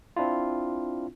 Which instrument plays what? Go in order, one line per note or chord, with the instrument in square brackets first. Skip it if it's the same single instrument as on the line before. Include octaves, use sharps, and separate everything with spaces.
[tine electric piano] C4 D4 E4 F4